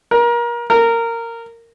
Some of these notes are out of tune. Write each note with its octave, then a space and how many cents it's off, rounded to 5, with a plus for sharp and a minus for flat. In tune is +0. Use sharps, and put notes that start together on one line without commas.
A#4 +30
A#4 -15